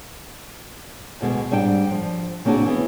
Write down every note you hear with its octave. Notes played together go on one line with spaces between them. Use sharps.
D2 B2 G#3 B3
G#2 G3 D4 G5
F3
C#3 A#3 C4 D4 F#4 G#4
E3 B3